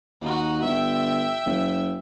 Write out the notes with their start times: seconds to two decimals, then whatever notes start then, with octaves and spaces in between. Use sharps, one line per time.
0.21 D#2 D#4 F#4
0.63 G1 E5 G5
1.46 F#1